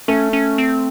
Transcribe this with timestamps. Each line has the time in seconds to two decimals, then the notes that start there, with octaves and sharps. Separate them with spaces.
0.08 A3 C#4
0.33 C#4
0.58 C4